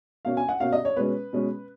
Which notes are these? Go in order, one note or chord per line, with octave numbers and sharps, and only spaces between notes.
B2 A#3 C#4 F5
G#5
F#5
B2 A#3 C#4 F5
D#5
C#5
B2 G#3 C#4 B4
B2 G#3 C#4